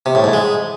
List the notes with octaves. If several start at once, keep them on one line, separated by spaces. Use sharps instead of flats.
C3
A2
G#2
G#3